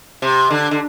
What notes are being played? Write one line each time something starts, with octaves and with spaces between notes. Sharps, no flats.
C3
D3
D3